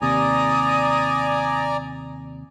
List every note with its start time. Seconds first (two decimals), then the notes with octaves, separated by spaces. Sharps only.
0.02 D#2 C3 D5 G#5 A#5 D#6